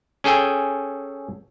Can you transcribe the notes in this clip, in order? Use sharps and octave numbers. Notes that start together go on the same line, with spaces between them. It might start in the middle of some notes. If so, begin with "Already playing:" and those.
C#4 G#4 A4 G5 G#5